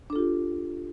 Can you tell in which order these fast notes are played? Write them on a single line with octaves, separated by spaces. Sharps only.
D4 A4 F4 G4